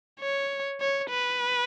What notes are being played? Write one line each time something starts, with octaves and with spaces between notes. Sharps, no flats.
C#5
C#5
B4